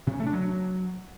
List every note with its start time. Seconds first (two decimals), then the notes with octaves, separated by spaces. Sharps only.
0.07 C3
0.13 C#4
0.20 A3
0.26 D4
0.33 F#3